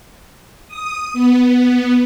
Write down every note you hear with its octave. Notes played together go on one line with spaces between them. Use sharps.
D#6
B3